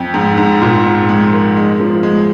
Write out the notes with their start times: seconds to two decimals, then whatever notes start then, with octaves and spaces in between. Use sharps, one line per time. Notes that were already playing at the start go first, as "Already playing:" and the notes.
Already playing: F2
0.14 G#2
0.37 G#2
0.62 A#2
0.85 G#2
1.09 G#3
1.32 A#3
1.57 G#3
1.80 F3
2.03 G#3